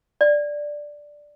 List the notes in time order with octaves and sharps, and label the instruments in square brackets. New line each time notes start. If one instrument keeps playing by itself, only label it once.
[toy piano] D5